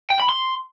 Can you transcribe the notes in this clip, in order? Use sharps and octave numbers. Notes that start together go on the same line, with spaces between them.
G5
B5
C6